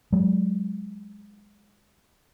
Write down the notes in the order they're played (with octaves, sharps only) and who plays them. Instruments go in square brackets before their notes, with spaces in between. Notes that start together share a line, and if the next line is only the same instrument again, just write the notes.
[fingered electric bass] F#3 G#3